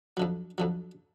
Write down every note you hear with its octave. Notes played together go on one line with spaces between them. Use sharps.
F2 D3 F#3
F2 D3 F#3